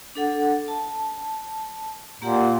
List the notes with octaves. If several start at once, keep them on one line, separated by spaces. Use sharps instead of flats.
D4 A4 F#5
A5
A#2 A#3 G4 F#5